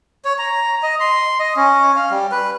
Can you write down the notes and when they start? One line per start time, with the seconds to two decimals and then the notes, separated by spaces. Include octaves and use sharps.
0.25 C#5
0.38 A#5
0.83 D#5
1.00 C6
1.40 D#5
1.56 C#4
1.96 F5
2.10 G3
2.31 B4